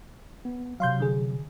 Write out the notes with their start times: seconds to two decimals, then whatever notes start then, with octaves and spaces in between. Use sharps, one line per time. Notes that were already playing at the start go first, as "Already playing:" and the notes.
0.45 B3
0.80 C3 F#3 F5 C6 G6
1.00 D3 G#4